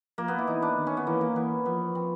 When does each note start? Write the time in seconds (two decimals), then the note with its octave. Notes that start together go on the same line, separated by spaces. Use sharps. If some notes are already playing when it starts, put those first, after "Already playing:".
0.18 F3 A#3
0.28 B3
0.38 E4
0.47 E3 D#4
0.62 D4
0.77 D#3
0.87 C#4
0.97 B3
1.07 E3 A#3
1.21 A#3
1.36 E3 B3
1.66 F3 B3
1.95 C4